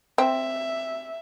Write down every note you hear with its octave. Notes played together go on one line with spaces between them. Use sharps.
C4 E5